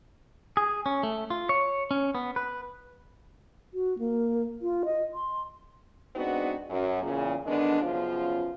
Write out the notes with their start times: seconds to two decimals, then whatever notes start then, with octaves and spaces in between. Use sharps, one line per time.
0.57 G#4
0.86 C#4
1.03 A3
1.30 F4
1.49 C#5
1.91 C#4
2.15 B3
2.36 B4
3.74 F#4
3.99 A#3
4.62 F4
4.85 D#5
5.14 C6
6.16 G#3 B3 C4 D4 D#4 F#4
6.70 F#2
7.03 E2 A#2 C#3
7.46 D3 D#3 G#3 B3 D4
7.81 F#2 C#3 F3 B3 F4